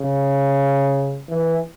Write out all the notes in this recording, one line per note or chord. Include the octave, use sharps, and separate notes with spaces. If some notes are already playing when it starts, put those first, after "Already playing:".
Already playing: C#3
E3